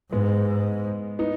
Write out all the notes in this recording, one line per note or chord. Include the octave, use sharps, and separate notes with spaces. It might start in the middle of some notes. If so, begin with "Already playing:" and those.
G#2 G#3 B3
B3 D#4